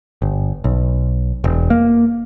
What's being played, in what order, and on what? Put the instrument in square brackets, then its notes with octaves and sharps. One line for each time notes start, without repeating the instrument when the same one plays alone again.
[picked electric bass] G1
B1
E1
A#3